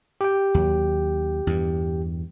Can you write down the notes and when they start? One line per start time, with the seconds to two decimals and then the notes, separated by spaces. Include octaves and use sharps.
0.21 G4 G5
0.54 D#2 F#3
1.47 E2 G2